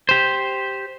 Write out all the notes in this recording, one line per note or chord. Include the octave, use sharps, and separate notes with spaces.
G4 C5